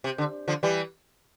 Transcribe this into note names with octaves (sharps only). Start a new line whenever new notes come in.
C3
D3
D3 F3
E3 G3